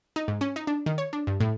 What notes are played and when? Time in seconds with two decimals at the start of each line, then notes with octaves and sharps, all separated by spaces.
0.16 D#4
0.28 G#2
0.41 C#4
0.56 D#4
0.67 D4
0.86 D#3
0.98 C#5
1.13 D4
1.27 G2
1.40 A2